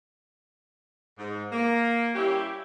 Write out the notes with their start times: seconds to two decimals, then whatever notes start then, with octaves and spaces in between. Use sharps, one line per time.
1.18 G#2
1.52 A#3
2.15 G3 C#4 E4 G4